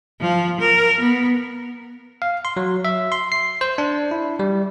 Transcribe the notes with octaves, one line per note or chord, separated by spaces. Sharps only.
F3
A#4
B3
F5
C6
F#3
E5
C6
C7
C5
D4
E4
G3